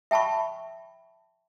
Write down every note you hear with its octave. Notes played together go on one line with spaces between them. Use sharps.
E5 G5 A5 B5 C#6